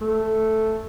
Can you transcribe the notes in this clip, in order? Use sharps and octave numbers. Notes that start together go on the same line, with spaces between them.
A3